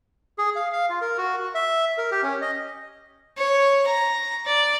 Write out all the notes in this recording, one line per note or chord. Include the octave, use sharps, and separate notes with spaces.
G#4
F5
F5
F4
A#4
F#4
F#4
E5
A#4
G4
C#4
D#5
C#5
A#5
D5